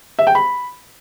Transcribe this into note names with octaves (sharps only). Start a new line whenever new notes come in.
E5
G5
B5